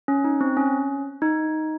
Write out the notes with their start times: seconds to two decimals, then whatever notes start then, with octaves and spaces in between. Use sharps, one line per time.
0.08 C#4
0.24 D#4
0.41 C4
0.57 C#4
1.22 D#4